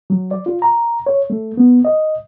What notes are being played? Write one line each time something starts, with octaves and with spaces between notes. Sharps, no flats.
F#3
D5
F4
A#5
C#5
A3
B3
D#5